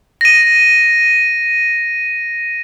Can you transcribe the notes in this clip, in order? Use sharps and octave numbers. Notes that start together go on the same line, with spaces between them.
A#6 D#7